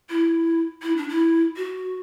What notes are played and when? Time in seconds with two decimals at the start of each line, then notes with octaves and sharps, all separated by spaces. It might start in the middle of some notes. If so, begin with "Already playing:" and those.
0.10 E4
0.82 E4
0.97 D4
1.09 E4
1.56 F#4